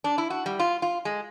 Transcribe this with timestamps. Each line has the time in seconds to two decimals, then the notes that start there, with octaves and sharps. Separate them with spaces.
0.04 D4
0.18 E4
0.30 F#4
0.46 G3
0.59 F4
0.82 F4
1.05 G#3